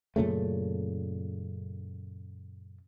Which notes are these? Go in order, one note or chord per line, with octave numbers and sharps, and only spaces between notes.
F#2 A#2 C#3 A3